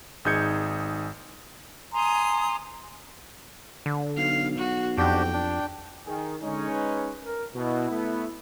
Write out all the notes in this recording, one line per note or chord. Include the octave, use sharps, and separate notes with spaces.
G#1 D#4 G#4 G6 G#6 C#7
G#5 A#5 C6 D#6
D3
B1 F5
F#4
F2 D4 F#4 G4 G5
D4
D#3 G#4
D3 G#3 C#4 D#4
B4
A#4
B2 E4
A3 B3